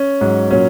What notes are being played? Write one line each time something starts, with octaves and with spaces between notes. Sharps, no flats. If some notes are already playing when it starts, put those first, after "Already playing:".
Already playing: C#4
G#2 F#3
A#2 F#3 C#4